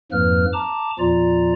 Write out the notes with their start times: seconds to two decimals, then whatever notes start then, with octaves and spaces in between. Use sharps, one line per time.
0.12 F2 G#2 F3 A#3 B4 F6
0.53 A5 A#5 D6
0.99 E2 A#2 F3 F4 D5 A#5